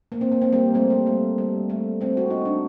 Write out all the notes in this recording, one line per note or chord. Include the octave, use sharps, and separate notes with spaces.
A#3
C4
A#3
C4
G3 A#3
A3 C4
G3 A#3
A3
G3
A3
A3 C4
F#4
D#4
D4